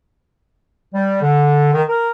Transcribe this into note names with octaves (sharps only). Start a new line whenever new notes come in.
G3
D3
D#3
A#4